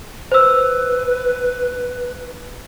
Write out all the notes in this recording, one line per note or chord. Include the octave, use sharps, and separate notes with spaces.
B4 C5 E6